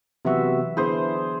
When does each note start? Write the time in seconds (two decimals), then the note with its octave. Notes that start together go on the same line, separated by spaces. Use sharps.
0.25 C3 E3 F#3 B3 F#4 E5
0.77 D3 B3 D4 E4 G#4 C5